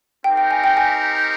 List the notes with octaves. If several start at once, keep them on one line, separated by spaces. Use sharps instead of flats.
C4 D#4 G4 A#4 G5
G5
G#5
G5
G#5